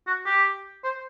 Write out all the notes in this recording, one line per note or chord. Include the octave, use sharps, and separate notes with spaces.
F#4
G4
C5